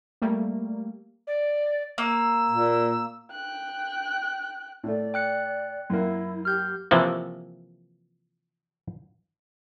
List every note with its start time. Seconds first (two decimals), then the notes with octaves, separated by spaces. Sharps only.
0.22 G3 A3 A#3
1.27 D5
1.98 A#3 E6
2.50 A#2
3.31 G5 F#6
4.84 A2 A3 D5
5.14 G5 F#6 C#7
5.90 F#2 A#3 E4
6.45 G4 F6 G6
6.91 C3 E3 F3 A#3